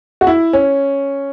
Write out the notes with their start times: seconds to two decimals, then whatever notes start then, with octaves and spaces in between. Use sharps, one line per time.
0.21 F#4
0.27 E4
0.53 C#4